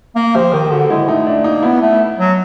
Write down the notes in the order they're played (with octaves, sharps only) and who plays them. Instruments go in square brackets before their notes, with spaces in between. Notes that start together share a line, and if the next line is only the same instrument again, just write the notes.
[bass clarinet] A#3
[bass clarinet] F3 [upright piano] G4
[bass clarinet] D#3 [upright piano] G4
[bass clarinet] D3 [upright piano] F#4
[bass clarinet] G#3 [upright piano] E4
[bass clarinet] A3 [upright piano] D#4
[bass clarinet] A3 [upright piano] D4
[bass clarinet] A#3 [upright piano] D#4
[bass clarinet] B3 [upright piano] E4
[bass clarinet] A3
F#3